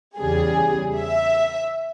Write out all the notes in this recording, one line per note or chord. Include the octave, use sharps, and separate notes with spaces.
E2 C#3 G3 G#4
E5